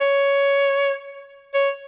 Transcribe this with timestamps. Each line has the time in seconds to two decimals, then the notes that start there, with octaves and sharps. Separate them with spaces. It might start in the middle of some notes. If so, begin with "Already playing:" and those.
0.01 C#5
1.55 C#5